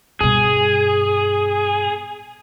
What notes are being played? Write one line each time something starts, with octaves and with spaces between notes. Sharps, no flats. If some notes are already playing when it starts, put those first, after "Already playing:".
G2 B2 G#4